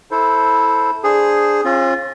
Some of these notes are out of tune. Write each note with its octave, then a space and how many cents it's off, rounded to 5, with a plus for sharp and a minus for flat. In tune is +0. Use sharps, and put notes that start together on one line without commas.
E4 -15 A4 +0 C5 +0
D4 +0 G#4 +0 C5 +0
C#4 -45 F4 +0